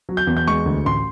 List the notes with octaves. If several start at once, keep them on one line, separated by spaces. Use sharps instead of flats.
F#3
G6
E2
G6
G#3 C#6
D2
A1 C6